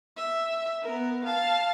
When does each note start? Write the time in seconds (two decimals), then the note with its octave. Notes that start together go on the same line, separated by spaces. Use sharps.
0.17 E5
0.83 B3 A#4
1.25 F5 A5